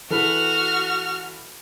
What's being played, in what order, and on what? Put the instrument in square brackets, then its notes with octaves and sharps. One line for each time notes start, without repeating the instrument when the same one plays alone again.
[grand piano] E3 A4 B4 [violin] F#4 F6